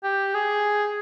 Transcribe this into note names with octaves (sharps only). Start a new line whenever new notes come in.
G4
G#4